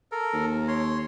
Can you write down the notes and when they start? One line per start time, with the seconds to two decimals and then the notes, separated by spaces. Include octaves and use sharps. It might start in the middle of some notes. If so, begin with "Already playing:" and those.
0.12 A4 A#4
0.33 D#2
0.68 C#5 C6